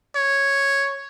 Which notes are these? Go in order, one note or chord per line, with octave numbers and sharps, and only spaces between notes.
C#5